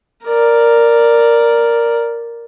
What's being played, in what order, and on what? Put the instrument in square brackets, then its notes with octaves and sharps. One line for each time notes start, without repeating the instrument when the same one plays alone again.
[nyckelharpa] A#4 D5